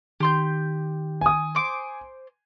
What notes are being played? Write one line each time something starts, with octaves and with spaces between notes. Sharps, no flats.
D#3 G4 C6 G6
G#5 D#6
C5 D6